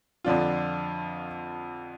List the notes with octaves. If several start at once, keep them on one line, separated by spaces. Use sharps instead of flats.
F2 D3 F3 D4 F4